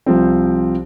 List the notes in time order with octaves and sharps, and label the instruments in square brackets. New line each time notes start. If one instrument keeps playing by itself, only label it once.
[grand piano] C2 F3 C4